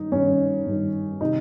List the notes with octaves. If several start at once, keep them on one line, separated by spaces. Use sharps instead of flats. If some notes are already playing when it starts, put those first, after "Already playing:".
Already playing: G2 D#3 D#4
G2 D#3 C#4
G2 D#3
C3 D#3 D#4